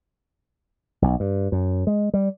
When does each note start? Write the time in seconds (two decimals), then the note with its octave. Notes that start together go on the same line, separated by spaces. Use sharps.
1.02 B1
1.20 G2
1.52 F#2
1.87 G#3
2.14 G3